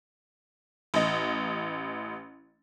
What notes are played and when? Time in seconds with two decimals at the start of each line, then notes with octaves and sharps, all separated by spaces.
0.94 A1 D#5